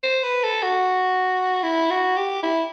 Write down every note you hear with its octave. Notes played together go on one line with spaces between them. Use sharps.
C5
B4
A4
F#4
E4
F#4
G4
E4